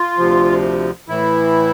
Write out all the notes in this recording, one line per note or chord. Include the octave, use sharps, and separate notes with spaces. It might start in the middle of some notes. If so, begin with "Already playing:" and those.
Already playing: F4
D2 C3 F3
A2 E3 E4